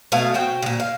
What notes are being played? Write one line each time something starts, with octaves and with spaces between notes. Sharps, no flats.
B2 A3 F5 G#5
F#4 C5 G5
A#2 C#3
F5